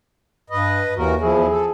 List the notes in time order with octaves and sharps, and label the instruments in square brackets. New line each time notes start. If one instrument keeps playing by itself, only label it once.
[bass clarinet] G2 [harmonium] B4 D#5
[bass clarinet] D#2 [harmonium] E3 F#4 A#4
[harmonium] E2 F3 E4 [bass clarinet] G#4
[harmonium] A4